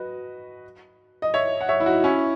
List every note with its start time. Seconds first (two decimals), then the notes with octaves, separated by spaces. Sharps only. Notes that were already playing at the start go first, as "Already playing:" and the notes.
Already playing: F#4 B4 D#5
1.22 D#5
1.34 C#5 E5
1.61 F#5
1.69 C#5 E5
1.80 E4
1.86 D#4 F#4
2.04 C#4 E4